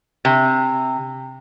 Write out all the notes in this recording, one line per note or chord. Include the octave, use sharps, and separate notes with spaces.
C3